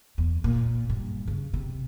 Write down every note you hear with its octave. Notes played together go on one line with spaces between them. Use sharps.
E2
A#2
G2
C#3
C3